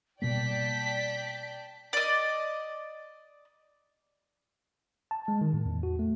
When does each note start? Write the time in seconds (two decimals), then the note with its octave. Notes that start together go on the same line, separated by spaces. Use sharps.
0.22 B2 G3 A#3 D5 G5 A5 B6
1.93 D5 D#5
5.11 A5
5.28 G#3
5.41 D#3
5.53 A2
5.66 E2
5.83 F#4
5.99 A3